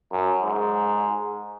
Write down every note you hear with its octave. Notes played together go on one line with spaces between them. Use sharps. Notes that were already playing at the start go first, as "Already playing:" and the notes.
F#2
G#2